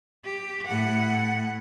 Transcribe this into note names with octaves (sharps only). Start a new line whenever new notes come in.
G4
A2 F#5